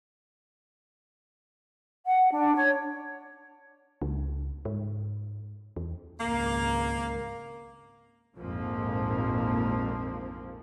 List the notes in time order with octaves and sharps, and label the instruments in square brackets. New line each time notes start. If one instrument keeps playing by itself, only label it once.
[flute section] F#5
D4
C#5
[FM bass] C#2
G#2
E2
[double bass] G#1 C#2 [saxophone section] A#3
[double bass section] A#1 F2 G#2 F3 A#3 C4